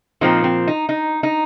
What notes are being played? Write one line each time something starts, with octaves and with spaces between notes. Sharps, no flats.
A#2 F3 C4 D#4
C4
D#4
D#4
D#4